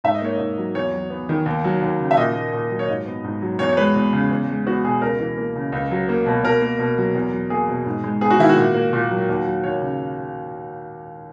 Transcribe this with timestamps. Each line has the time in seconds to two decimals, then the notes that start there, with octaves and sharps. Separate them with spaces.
0.04 G#2 E5
0.14 D#5
0.21 A#3 C#5
0.35 G#2 D#5
0.58 F#3
0.75 E2 C#5
0.93 F#3
1.10 B3
1.29 D#3
1.46 D#2
1.64 F#3
1.81 D#2
2.00 C#3
2.11 E5
2.17 A#2 D#5
2.35 A#3
2.53 A#2
2.71 F#3
2.79 C#5
2.88 G#2 D#5
3.06 B3
3.24 G#2
3.42 F#3
3.59 E2 C#5
3.69 C#5
3.77 G#3 B4
3.95 E2
4.13 C#3
4.31 E2
4.49 G#3
4.66 B3 F#4
4.84 B2 G#4
5.02 C#2 A#4
5.20 E3
5.38 A#3
5.55 C#3
5.72 C#2
5.91 F#3
6.09 A#3
6.26 B2
6.43 B2 A#4
6.61 A#3
6.79 B2
6.98 F#3
7.15 E2
7.33 F#3
7.50 A#3 G#4
7.69 B2
7.85 G#2
8.04 G#3
8.21 B3 G#4
8.30 F#4
8.39 D#3 E4
8.49 F#4
8.57 A#2
8.74 A#3
8.93 A#2
9.11 F#3
9.29 D#2
9.46 F#3
9.64 D#2 C#5
9.81 C#3